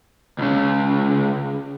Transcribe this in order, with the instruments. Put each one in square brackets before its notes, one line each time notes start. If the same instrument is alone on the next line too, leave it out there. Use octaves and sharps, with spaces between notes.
[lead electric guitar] C#2 C#3